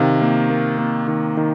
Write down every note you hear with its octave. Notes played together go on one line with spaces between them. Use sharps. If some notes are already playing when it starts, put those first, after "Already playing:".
Already playing: C3 D#3 F5
A#3
A#3
A#3
D#3
D#3